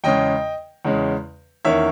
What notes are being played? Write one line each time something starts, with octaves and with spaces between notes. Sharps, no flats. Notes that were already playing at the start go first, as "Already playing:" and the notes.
E2 C#3 G#3 C#4 D#5 G5
E2 C#3 G#3 C#4
E2 D#3 A#3 C#4 C#5 E5